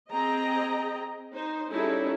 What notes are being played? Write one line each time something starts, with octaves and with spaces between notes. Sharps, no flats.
C4 G#4 D#5 G5 A#5
D#4 C5
G3 C#4 D#4 E4 G#4 A4